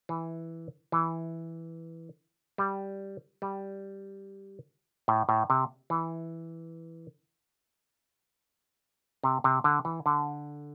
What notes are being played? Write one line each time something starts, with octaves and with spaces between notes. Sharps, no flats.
E3
E3
G3
G3
A2
A2
C3
E3
C3
C3
D3
E3
D3